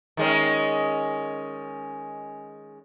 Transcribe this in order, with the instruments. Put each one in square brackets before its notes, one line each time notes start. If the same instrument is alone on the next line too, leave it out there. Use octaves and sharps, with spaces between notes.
[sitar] D#3 G#3 C#4